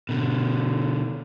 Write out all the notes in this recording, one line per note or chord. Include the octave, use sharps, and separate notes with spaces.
B2 D3